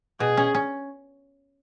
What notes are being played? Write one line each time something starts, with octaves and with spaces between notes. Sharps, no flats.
B2 G#4
C#4
C#4